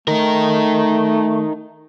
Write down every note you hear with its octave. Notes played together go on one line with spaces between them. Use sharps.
A3 D#4 A#4